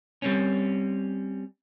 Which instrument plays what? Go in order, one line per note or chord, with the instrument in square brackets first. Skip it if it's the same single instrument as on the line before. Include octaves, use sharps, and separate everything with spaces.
[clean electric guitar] G3 C4 C#4